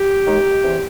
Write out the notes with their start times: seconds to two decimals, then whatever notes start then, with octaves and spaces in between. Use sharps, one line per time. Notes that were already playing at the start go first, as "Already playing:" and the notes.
Already playing: G4
0.25 D#2 D#3 G#3
0.63 E2 C3 E3